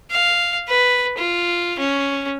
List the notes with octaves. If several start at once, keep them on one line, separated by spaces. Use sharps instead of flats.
F5
B4
F4
C#4